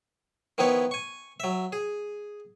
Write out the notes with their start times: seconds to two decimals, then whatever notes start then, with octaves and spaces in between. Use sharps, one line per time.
0.58 D#3 F3 B3 E4 B4 C#5
0.91 G#5 C#6
1.40 F#3 E5
1.72 G#4